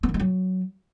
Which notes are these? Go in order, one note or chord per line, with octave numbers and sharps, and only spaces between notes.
B3
D#3
G#3
F#3